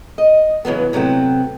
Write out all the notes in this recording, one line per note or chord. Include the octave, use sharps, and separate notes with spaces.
D#5
C#3 E3 F#3 B3
C3 F#3 A3 B3 C4